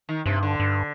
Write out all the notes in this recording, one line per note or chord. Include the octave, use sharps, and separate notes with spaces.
D#3
G2 C3
D3
G2